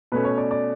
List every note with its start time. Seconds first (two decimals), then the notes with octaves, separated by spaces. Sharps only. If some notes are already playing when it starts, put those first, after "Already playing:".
0.12 B2 A3 C#4 B4
0.24 C#5
0.38 D5
0.51 D5